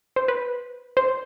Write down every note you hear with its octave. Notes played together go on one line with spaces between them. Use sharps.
C5
B4
C5